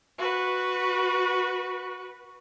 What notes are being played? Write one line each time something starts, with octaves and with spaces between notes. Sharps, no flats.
F#4 B4